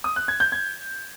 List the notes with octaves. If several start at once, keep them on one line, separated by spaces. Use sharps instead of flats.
D#6
F#6
G#6
G6
G#6